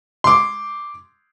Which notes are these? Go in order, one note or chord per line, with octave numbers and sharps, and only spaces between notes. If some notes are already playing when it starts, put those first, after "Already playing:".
C6 D6